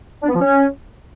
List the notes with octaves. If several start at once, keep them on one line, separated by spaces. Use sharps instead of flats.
D4
B3
F3
C#4